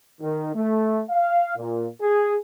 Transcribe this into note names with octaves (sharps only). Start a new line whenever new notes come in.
D#3
A3
F5
A#2
G#4